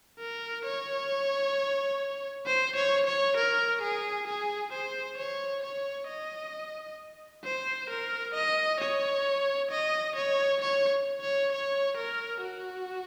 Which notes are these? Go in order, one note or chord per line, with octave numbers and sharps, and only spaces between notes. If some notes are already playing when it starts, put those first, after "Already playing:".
A#4
C#5
C5
C#5
C#5
A#4
G#4
G#4
C5
C#5
C#5
D#5
C5
A#4
D#5
C#5
D#5
C#5
C#5
C#5
C#5
A#4
F#4